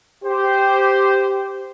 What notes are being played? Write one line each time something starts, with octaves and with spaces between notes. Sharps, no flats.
G4 C5